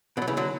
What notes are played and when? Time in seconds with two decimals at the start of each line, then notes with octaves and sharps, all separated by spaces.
0.17 B2 D3
0.22 F#3
0.28 C#3 E3
0.37 D3 F#3